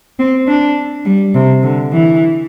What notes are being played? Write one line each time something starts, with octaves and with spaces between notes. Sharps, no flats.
C4
D4
G3
C3
D3
E3